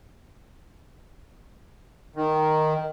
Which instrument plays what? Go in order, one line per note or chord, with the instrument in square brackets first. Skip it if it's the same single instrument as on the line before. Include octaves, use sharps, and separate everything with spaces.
[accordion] D#3